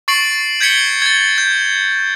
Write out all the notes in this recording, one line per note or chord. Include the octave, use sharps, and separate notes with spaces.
C#6 A6 C7 D7 F#7
G6 G#6 B6 C#7 G7
G#6 A6
G6